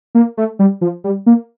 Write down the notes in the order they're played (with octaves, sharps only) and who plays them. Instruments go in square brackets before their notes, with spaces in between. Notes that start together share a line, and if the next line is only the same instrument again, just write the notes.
[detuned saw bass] A#3
A3
G3
F3
G3
A#3